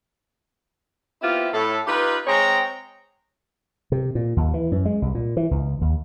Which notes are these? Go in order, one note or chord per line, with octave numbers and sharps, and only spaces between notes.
B3 C4 E4 F4 G4
A2 A4
D#4 F4 G4 B4
G#3 C4 G#4 C#5 G5 A#5
C3
A#2
D#2
E3
F#2
G#3
C2
A#2
E3
C#2
D#2